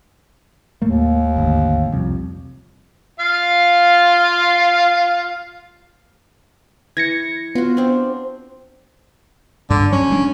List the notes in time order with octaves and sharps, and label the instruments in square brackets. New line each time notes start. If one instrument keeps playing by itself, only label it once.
[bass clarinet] D#2 [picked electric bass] A2 A3 A#3
[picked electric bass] G#1 D2
C2 F2
[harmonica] F4 F5
[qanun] E3 [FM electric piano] G#6 A#6 C#7
[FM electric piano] B3 [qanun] F4 F#4
[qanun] C4 D4
[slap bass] G2 [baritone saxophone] D3
[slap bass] F#3 [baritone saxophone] C#4
[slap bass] G#3 D4